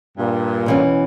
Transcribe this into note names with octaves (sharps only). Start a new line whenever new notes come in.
G2 A#2
B2 E3 C#4